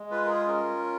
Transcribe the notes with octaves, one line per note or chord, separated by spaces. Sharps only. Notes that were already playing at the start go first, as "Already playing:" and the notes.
Already playing: G#3
F4 B4
A#4
G#4
C#4 A#4